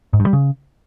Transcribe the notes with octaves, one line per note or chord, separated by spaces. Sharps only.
G#2
G2
G3
C#3